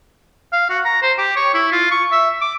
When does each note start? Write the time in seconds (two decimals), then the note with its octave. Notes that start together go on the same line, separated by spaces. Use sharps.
0.52 F5
0.69 F#4
0.85 A#5
1.02 C5
1.18 G4
1.36 C#5
1.54 E4
1.72 F4
1.91 C#6
2.12 E5
2.41 D6